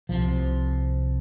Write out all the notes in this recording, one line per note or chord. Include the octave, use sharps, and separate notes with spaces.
C2 C3 F3